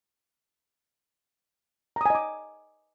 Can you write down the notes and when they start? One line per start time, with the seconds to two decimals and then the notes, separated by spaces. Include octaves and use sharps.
1.96 A#5
2.01 D#6
2.06 G#5
2.10 D#5
2.15 D6